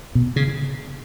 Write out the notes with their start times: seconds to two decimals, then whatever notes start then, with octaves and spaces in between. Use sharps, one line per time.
0.15 B2
0.36 C#3